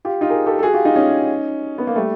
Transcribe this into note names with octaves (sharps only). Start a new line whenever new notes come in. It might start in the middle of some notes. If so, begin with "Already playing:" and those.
F4 G4
D#4 F4
G#4 A#4
G4 A4
A4
F#4 G#4
F4 G4
D#4 F4
C#4 D#4
B3
A#3
G3 A3